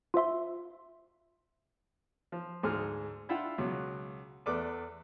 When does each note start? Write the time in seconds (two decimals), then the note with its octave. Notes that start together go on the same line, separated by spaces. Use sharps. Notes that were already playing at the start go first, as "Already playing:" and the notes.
0.14 F4 C5 E5 C6
2.32 F3
2.63 D2 G#2 G#4 F6
3.29 D4 E4 F4 E5 F#5 G5
3.58 C#2 B2 F#3
4.46 E2 A3 B4 D5 D6